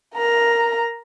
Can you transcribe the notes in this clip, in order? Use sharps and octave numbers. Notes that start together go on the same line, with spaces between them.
A#4 A#5